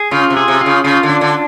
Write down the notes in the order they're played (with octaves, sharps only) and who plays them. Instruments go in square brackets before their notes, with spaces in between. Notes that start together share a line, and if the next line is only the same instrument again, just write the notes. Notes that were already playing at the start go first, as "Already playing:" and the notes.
Already playing: [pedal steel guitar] G#4
[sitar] C#3 [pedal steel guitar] F4
[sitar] C3
[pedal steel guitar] G#4
[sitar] C3
[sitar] C#3 [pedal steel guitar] F4
[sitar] C#3 [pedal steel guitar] F4
[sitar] D3
[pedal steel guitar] D4
[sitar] D3